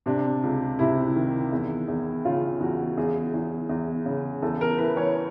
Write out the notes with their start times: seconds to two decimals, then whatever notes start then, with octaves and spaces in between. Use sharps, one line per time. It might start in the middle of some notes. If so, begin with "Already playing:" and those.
0.06 C3 D4
0.43 C#2
0.79 C3 E4
1.16 D#3
1.52 E2
1.88 E2
2.25 C#3 F4
2.60 E2 F#4
2.97 E2 G#4
3.33 E2
3.69 E2
4.05 C#3
4.42 E2 A4
4.61 A#4
4.78 E3 B4
4.97 C#5